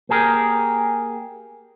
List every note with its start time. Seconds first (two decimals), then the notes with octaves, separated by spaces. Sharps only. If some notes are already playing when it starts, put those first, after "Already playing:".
0.09 A#3 G4 G#4 A#4